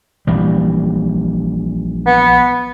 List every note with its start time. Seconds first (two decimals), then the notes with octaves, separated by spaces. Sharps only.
0.27 A#1 E3 G3
2.06 B3